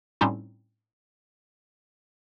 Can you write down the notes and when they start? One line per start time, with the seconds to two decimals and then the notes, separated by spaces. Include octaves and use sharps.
0.21 A2 G3 C4 C#4 D#4 F4